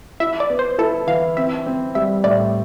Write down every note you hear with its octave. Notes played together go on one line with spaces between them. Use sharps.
E4 E5
D5
B3
C5
E4 A4
E3 F5
C4 E5
C4
G3 E5
A2 D5